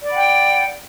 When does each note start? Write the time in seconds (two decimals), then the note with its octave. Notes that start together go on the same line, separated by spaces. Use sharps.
0.02 D5
0.07 B5
0.12 F#5
0.17 G5